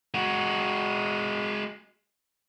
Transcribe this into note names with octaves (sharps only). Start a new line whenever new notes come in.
G#3 F#4